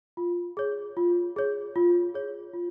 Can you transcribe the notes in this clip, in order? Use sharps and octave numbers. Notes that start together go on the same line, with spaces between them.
F4
G#4 C#5
F4
G#4 C#5
F4
G#4 C#5
F4